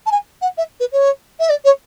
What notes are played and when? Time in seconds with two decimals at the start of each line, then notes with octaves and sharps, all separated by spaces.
0.06 A5
0.11 G#5
0.41 F#5
0.57 E5
0.80 B4
0.92 C#5
1.39 E5
1.49 D5
1.64 C#5